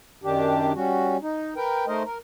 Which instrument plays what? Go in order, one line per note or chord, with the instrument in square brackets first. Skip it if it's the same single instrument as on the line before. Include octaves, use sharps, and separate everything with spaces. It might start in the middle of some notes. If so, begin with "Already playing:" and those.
[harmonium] F#2 D#3 D4 G4
G3 C#4 F#4
D#4
A#4 B4 G5
A3 D#4 A#4 C5 D#5
A#4